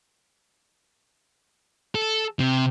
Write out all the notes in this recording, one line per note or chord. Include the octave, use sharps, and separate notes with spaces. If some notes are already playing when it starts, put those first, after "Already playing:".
A4
C3